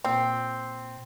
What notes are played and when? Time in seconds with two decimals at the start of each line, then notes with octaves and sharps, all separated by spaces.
0.05 A#2 C4